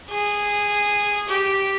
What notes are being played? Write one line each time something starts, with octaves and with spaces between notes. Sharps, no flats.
G#4
G4